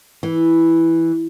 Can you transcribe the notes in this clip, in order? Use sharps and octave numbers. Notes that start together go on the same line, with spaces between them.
E3